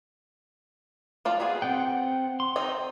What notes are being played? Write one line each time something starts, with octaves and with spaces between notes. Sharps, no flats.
F3 F4 D5
B3 F4 G#4
C4 F#5 G5
C6
D#3 C4 D#4